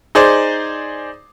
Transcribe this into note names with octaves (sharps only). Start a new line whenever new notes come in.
D#4 G#4 C5 D5